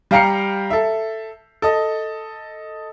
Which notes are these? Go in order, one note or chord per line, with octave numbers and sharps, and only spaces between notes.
G3 F5 G5 A#5 C7 C#7
A4 E5
A4 D#5